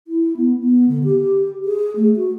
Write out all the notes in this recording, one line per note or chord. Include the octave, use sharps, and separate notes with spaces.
E4
B3
B3
D3
G4
G#4
A3
F#4